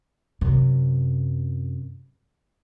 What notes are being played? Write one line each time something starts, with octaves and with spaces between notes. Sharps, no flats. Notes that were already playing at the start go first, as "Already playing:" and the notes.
F#2 C3